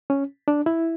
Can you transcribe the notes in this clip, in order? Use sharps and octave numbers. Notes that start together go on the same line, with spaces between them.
C#4
D4
E4